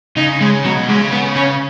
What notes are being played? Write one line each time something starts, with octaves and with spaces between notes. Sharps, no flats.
C#3 D#4
C#3 G#3
B2 F#3
C#3 G#3
B3
C#4